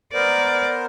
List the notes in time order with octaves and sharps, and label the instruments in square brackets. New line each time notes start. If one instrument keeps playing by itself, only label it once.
[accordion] B3 A#4 C5 [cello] D5